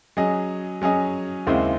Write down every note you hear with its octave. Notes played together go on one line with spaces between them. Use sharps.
F#3 C#4 G#4 D#5
F#3 C#4 G#4 D#5
D#2 C#3 G#3 C4 E4